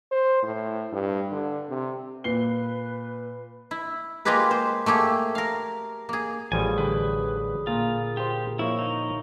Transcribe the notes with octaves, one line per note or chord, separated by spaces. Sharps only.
C5
A2
G2
D3
C3
A#2 B4 C7 G7
E4
G#3 A#3 F4 G4 G#4 B4
C5
A3 A#3 G4 G#4
A#4 F5
A#3 G#4
A1 F3 G3 G#4 G#5 B5 D#6
D3 B4
A#2 F4
F4 G4 C5
F3 A#3 E4 C#5 C#6
D#4